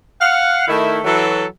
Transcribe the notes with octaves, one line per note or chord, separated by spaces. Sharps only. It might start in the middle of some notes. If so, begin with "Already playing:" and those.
F5 F#5
D#3 A3 E4
E3 F#3 A4